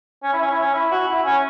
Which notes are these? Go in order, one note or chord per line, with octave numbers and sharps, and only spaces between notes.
C#4
E4
C#4
E4
C#4
E4
F#4
E4
C#4